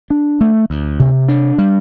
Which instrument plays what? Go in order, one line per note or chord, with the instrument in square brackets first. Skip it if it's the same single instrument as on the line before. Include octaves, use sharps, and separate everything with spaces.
[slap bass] D4
A3
D2
C3
D4
G3